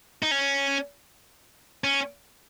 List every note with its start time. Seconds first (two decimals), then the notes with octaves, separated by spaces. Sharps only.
0.23 D#4
0.31 C#4
1.84 C#4